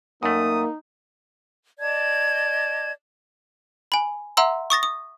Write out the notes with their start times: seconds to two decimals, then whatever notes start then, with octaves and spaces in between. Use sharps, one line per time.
0.23 F#2 A3 A#3 D#4 D#6
1.79 D5 D#5 A5 G#6
3.92 G#5 B5
4.37 E5 F#5 A#5 C6 E6
4.70 C#6 D#6 A6 A#6
4.83 D#6